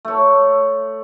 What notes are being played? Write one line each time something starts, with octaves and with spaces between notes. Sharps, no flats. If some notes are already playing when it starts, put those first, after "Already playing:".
A3 C#5